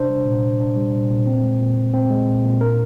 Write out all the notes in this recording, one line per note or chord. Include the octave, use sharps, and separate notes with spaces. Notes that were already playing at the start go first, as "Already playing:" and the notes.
Already playing: C3 D4 C5
G3
A#2
A#2
D4
G3
A#2
A#2
C4
G#3
A#2
A#2
C4
G#3
A#2
A#2
D4 A#4